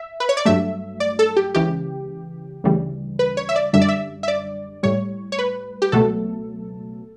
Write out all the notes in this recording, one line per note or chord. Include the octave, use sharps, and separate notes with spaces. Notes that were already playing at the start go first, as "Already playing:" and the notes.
Already playing: E5
B4
C#5
D5
G2 F#3 A3 E5
D5
A4
G4
C#2 C#3 E3 G4
D2 C#3 E3 G3
B4
C#5
E5
D5
F#2 D3 G3 E5
D5
E5
E5
D5
A2 G3 C#5
C#5
B4
G4
C#2 B2 F#3 A3 A4